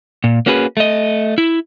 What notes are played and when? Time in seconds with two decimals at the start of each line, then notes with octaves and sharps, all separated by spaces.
0.24 A#2
0.46 A#3 C#4 F#4 G#4 B4
0.77 A3 D#5
1.38 E4